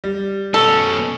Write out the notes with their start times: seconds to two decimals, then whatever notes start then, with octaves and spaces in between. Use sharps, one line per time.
0.04 G3
0.54 B2 C#4 A4